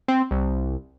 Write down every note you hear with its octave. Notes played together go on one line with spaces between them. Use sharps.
C4
C2